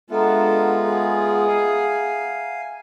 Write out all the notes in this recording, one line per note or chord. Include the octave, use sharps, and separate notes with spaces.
G#3 B3 D4 F4 A4 E5 F#5 A#5
G#4
F5 G#5